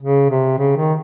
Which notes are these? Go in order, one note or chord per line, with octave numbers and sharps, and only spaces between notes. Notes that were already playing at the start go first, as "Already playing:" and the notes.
C#3
C3
C#3
D#3